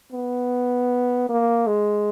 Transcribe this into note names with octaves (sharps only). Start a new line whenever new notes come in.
B3
A#3
G#3